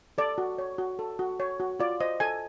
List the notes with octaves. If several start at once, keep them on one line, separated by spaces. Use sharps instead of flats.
A4 D5
F#4
C#5
F#4
A4
F#4
C#5
F#4
F4 D5
C5 D#5
A4 G#5